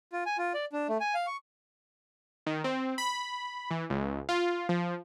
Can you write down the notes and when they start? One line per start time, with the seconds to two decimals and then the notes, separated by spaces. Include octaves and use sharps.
0.13 F4
0.26 G#5
0.38 F4
0.54 D5
0.73 D4
0.89 A3
1.01 G#5
1.14 F5
1.27 C#6
2.47 D#3
2.64 C4
2.98 B5
3.71 E3
3.90 C#2
4.29 F4
4.69 F3